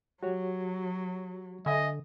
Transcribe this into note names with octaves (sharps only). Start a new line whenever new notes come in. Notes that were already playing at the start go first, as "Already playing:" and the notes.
F#3 F#4 G4 C#5
D3 D#5 E5 G#5